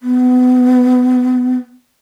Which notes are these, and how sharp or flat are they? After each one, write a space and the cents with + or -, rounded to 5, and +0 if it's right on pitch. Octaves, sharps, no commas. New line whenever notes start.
B3 +30